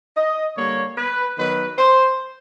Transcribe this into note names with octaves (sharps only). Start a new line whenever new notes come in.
D#5
D3 G3 A#3 C#5
B4
D#3 F#3 B3 B4
C5